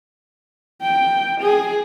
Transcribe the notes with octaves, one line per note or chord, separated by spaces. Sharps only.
G5
G#4